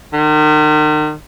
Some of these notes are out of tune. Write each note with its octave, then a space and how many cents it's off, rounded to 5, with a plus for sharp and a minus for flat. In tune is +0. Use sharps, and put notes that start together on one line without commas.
D#3 -35